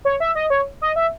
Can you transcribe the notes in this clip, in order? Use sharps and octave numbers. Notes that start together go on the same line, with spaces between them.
C#5
E5
D#5
C#5
D#5
E5